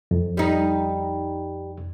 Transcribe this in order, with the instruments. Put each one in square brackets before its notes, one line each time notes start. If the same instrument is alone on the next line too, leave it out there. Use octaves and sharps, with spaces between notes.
[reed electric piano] F2
[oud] G3 D#4